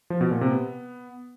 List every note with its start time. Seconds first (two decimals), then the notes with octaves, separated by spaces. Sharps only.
0.10 F3
0.21 B2
0.31 A#2
0.41 C3
0.52 B3